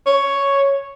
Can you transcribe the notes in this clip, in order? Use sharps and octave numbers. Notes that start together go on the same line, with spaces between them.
C#5